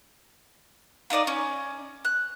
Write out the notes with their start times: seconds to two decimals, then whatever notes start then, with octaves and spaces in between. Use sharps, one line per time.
1.10 A#3 D#4 D5 D#6
1.27 C#4
2.05 F#6